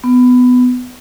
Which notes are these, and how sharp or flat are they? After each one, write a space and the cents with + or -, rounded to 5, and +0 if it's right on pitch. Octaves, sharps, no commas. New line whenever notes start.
B3 +15